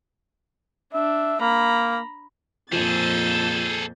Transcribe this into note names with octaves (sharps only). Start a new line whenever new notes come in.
D4 E5
A#3 A#5 B5
F2 A#2 F3 G#4 A4 G6 A6